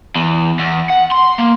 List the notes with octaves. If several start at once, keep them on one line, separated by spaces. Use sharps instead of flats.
E2
E2
F#5
C6
A#3